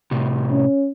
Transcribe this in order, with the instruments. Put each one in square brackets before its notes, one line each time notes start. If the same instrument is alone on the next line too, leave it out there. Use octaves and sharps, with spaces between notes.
[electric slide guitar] A2 C3
[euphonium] C#4